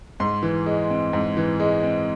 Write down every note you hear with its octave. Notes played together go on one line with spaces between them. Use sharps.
G#2 C6
E3
G#3
C4
G#2
E3
G#3
C4